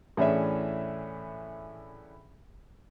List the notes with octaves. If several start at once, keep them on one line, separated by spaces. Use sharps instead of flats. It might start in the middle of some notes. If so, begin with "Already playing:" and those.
A2 E3 C#4 D4 G#4 E5